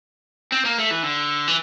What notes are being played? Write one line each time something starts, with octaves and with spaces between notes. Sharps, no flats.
C4
A#3
A3
E3
D3
E3